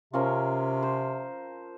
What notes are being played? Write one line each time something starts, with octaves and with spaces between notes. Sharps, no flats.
C3 F3 C#4 A#4
C5